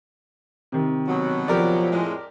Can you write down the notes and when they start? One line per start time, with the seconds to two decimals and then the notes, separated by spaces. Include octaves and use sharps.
0.72 C3 D#3
1.08 B2 F#3
1.48 F3 G4 A#4 D5
1.92 F2 A2 G#3